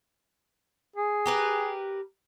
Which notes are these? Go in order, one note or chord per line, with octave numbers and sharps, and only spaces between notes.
G#4
G4 A#4 B4